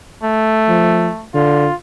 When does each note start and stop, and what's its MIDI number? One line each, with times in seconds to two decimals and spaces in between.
0.23 1.26 57
0.68 1.09 53
1.34 1.66 50
1.34 1.74 65